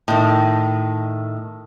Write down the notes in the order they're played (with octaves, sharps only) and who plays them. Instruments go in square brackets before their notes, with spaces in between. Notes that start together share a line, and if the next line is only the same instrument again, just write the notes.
[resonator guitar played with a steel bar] A2 D#3